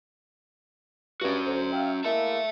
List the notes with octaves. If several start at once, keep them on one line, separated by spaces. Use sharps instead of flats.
G2 C#4 F#4
D2 C5
E5 F5 G5
G#3 A#3 E4 E5 A5